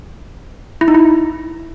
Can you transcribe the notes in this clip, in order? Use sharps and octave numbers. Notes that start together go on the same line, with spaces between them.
E4
D#4
E4